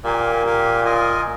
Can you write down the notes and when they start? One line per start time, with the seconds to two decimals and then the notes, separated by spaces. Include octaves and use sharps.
0.04 A#2 G4 A#4 F5 G#5
0.44 G4 A#4 F5 G#5
0.85 F4 A#4 D#5 G#5